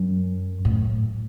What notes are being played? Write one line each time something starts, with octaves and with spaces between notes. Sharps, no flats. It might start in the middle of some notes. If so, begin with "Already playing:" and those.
Already playing: F#2
A2